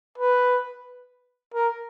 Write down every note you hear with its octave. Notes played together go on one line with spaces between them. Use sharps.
B4
A#4